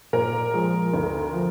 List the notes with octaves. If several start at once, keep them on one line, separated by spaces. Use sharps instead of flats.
A#2 A#4
F3 G#3
D2
F3